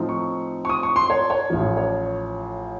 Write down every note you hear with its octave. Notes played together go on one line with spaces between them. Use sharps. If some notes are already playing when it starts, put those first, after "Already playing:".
Already playing: A2 F3 C4 D#4
C#6
C#6
D#6
C#6
C6
C#5
C#5
A1 A2 F3
C#5